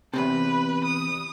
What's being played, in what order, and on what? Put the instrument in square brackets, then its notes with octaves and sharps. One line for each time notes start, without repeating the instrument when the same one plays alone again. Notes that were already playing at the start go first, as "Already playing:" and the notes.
[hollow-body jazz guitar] E2 A2 C3 [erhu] B4
[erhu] D#6